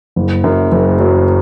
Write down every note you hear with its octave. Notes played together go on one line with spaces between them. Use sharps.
F#1
F#2
F#1
F#3